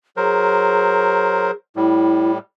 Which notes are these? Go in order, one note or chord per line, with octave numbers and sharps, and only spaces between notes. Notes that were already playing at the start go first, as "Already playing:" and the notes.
F#3 G#4 A#4 C5
A2 G3 E4